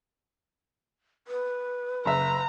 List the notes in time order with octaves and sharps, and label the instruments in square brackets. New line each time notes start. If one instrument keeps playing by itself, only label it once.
[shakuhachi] B4
[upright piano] F#1 E5 [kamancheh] A#5